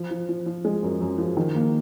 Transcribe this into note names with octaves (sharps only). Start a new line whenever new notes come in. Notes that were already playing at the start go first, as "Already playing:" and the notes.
Already playing: F3
F3
F3
F3
G#3
F#2
F#2
F3
D#3
A#3